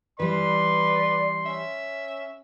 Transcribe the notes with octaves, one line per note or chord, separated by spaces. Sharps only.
E3 G3 B4 D5 C6
C#4 E5